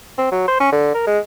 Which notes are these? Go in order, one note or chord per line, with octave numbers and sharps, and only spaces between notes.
C4
F#3
C5
C#4
D3
A#4
G#3